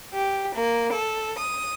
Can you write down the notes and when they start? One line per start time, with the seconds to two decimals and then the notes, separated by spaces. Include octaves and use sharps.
0.13 G4
0.55 A#3
0.93 A4
1.40 D#6